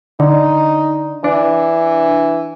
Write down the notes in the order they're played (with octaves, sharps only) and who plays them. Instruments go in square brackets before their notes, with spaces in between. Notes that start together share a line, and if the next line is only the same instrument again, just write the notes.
[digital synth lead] D3 [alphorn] D#4
[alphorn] E3 [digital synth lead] D4